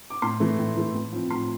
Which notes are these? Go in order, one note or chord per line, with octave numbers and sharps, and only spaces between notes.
D6
A2 C6
E3 A3
A2
E3 A3
A2
F3 C4
A2 C6